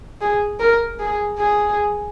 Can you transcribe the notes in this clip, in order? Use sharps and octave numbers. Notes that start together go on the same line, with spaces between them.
G#4
A#4
G#4
G#4